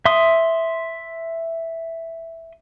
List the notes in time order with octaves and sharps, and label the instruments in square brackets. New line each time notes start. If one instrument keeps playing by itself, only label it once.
[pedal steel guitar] E5 C6 D#6